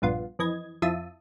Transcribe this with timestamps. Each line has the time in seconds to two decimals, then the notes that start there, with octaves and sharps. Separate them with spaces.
0.02 A#1 G2 B3 F4
0.39 F2 E3 D#5 G#6
0.82 F2 E4 F4 E5 A5 D#6